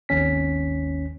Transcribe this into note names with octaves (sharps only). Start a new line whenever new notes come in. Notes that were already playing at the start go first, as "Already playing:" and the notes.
G#1 D#2 C#4 B6